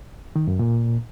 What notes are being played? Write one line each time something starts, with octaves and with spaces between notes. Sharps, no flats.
D#3
F#2
A#2